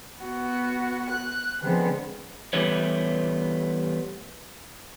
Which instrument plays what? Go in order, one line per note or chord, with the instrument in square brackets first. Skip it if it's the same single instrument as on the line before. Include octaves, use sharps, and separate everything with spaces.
[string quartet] B3 F#4
F#6
D3 F3 G#3 B3 C4
[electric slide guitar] E3 G3 A3 B3 C#5